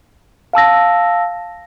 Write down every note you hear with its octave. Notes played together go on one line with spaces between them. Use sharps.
F5 A5 E6 A#6